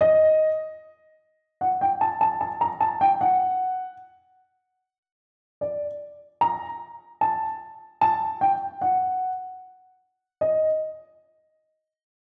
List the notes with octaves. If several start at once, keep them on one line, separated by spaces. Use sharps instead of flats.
D#5
F#5
G5
A5
A5
A5
A#5
A5
G5
F#5
D5
A#5
A5
A5
G5
F#5
D#5